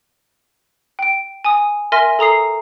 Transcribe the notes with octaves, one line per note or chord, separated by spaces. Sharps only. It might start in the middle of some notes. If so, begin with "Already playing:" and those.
G5 D7
G#5 D#6
A#4 E5 G#5 C6 F6 A#6
A4 A#5 D#6 C7